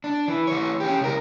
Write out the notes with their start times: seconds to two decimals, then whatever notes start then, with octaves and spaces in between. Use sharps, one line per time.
0.04 D4
0.28 E3
0.47 E3 C#5
0.80 C#4 G4
1.01 C#2 A#4